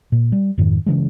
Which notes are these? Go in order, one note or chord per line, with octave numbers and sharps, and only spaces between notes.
A#2
G3
F2 G#2 D#3
C#3 E3 G#3